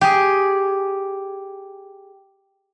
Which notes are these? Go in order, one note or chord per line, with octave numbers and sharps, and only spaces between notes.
G4 G#4